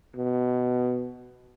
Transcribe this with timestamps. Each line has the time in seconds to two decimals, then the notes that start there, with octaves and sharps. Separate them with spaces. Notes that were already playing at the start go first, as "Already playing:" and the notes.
0.16 B2